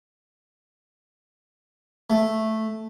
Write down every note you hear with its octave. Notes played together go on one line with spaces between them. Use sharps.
A3